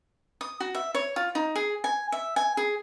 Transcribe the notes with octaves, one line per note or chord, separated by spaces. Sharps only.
D#6
F#4
E5
C#5
F4
D#4
G#4
G#5
E5
G#5
G#4